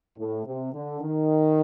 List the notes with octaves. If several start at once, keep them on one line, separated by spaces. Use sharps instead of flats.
A2
C3
D3
D#3